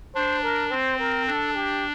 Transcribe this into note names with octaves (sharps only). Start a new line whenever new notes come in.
D4 C5
A#4
C4 C5
A#4
D4 A4
G4